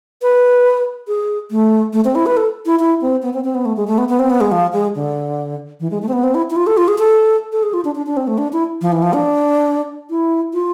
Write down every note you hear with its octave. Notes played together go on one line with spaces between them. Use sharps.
B4
G#4
A3
A3
C4
E4
B4
A4
E4
E4
C4
B3
C4
C4
B3
A3
G#3
A3
B3
B3
C4
B3
G#3
F3
G#3
D3
E3
G#3
A3
C4
B3
C4
E4
E4
F4
A4
F4
G#4
A4
A4
G#4
F4
D4
D4
D4
C4
A3
D4
E4
F3
E3
F3
D4
E4
F4